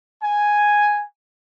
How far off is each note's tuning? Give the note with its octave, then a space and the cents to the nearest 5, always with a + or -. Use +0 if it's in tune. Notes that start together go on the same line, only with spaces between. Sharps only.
G#5 +0